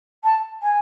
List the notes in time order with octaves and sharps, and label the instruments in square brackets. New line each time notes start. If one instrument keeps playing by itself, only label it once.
[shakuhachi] A5
G#5